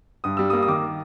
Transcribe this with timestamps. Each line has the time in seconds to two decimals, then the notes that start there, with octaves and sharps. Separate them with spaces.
0.24 G2 D#6
0.37 G3 E6
0.50 A#3 D#6
0.62 D#6
0.68 D#3 D6